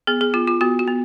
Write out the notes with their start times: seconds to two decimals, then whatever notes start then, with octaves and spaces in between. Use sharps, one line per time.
0.07 B3 G#4
0.21 G#4
0.34 B3 F4
0.48 F4
0.61 B3 F#4
0.79 F#4
0.87 B3